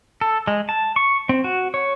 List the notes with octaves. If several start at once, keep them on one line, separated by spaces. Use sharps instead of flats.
A4
G#3
A5
C#6
C4
F#4
C#5